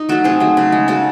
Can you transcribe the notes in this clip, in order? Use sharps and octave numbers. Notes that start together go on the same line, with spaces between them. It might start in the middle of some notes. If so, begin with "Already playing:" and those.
Already playing: D#4
F#3 A3 F#4 A4
C3 G#4 C5
F#3 A3
C#3
G#3
C#3 F#4 A4